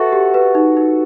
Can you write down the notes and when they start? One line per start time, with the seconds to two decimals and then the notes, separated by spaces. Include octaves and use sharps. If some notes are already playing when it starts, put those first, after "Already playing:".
Already playing: F#4 A4 B4 E5
0.12 G4
0.34 B4
0.55 D#4
0.77 D#4